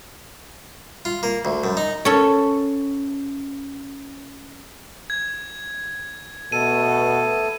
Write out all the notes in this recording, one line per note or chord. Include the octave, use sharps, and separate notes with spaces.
F4
A#3
D2
F#2
D#4
C#4 A4
G#6
B2 A3 B3 A4 D#7